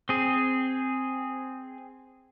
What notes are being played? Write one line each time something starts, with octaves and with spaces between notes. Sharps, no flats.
C4 G#4